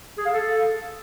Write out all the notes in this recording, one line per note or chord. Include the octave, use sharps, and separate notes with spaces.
G#4
F5
A4